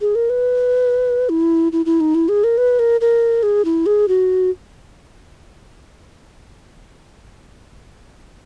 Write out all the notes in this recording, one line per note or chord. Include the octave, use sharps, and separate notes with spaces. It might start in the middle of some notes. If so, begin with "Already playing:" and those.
G#4
A#4
B4
E4
E4
E4
D#4
E4
G#4
A#4
B4
A#4
A#4
G#4
E4
G#4
F#4